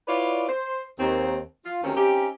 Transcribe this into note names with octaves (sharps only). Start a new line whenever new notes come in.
E4 F4 B4 C#5 D5
C5
D#2 C4
F4
D2 C3 D#3 C4 C#4 A#4
C4 C#4 D#4 G4